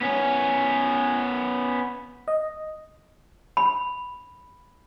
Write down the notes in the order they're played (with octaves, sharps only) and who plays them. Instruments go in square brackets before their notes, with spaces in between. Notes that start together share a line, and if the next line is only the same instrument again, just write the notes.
[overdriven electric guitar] B3 C#4
[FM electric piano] D#5
[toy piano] B5